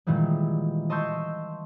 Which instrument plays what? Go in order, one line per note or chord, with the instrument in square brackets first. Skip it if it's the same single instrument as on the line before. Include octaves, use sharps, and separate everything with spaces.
[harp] A#2 D#3 E3 G3 G#3
D#5 A5 C6 C#6 E6 G6